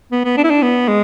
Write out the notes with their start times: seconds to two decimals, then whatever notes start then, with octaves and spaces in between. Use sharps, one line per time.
0.12 B3
0.25 B3
0.37 D4
0.44 E4
0.50 D4
0.62 B3
0.88 G#3